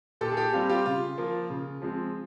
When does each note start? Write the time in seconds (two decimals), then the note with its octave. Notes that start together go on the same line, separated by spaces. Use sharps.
0.21 A#2 G4 A4
0.32 G#4
0.37 G4 A4
0.53 G3 C4 F4 G4
0.69 F4 G4
0.86 C#3 F4
1.18 F3 A#3
1.50 C#3
1.82 F3 G#3 C4